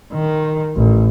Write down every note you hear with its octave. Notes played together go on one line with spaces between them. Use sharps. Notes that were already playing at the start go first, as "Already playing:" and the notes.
D#3
A1